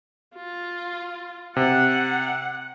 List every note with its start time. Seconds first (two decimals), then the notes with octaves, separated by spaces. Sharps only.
0.35 F4
1.56 C3 F#5